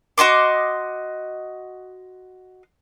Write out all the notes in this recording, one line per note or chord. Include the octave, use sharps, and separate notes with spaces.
F#4 D#5 C6 D6